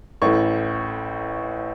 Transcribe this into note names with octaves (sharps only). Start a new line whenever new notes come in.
A1 A2 C#6